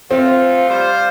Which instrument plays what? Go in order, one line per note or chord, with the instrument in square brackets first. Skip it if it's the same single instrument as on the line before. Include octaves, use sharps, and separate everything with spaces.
[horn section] F3 A3 F4 [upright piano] C4
[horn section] G3 F4 C5